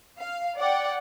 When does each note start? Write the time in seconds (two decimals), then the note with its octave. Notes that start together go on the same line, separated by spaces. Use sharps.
0.18 F5
0.57 D5 F#5 G5